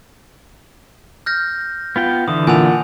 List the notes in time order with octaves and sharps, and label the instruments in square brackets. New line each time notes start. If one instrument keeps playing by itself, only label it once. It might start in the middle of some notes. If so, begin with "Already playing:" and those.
[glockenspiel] F6 G6 A#6
[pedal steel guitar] B3 F4 G5
[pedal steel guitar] D3 E3 [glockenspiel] D#6
[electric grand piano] A#2 F#5 [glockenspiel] G#5 A5 F7